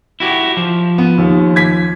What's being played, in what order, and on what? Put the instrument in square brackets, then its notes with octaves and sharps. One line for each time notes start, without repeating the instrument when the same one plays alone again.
[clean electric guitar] E4 F#4 G4
F3
[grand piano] B3
D#2
G#6 B6